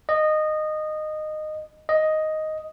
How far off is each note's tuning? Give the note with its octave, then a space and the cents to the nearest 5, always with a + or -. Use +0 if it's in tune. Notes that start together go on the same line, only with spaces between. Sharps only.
D#5 -15
D#5 +5